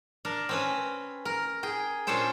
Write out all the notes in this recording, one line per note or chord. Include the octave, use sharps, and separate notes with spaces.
D4 A#4
C4 C#4 B4
A#4
G#4 G5
A#2 C#4 D4 A4 C5 G5